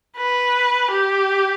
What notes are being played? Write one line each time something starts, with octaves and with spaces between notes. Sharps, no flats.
B4
G4